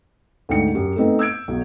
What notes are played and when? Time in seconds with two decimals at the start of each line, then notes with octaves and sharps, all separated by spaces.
0.49 D2 G#2 G5 C#7
0.75 F#2 G4
0.96 A3 B3 C4 D#4 B4
1.19 E6 G6 G#6 D7
1.48 B1 F#3